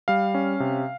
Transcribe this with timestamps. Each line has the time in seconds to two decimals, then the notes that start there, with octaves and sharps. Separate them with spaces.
0.08 G3 F5
0.34 C#4
0.60 C3